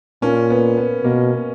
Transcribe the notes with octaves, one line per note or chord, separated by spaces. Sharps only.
A#2 A#3 C#4
B3
B3
B2 A#3